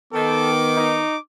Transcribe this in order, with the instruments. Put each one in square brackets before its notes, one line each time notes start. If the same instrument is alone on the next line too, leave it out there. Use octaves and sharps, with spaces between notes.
[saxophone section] D#3 [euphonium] B3 [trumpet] A4 [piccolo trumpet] D6
[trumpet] D#4